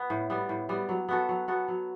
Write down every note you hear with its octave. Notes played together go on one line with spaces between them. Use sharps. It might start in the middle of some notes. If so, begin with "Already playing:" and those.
Already playing: B3
A2
G3 B3
A2
G3 B3
F#3
B3 F#4 A4
F#3
B3 F#4 A4
F#3